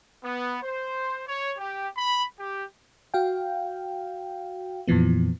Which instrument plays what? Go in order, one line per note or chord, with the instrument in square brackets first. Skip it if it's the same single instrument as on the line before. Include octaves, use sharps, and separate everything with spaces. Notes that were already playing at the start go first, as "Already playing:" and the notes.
[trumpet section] B3
C5
C#5
G4
B5
G4
[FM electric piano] F#4 F5 G5
F2 A#2 E3 F3 B3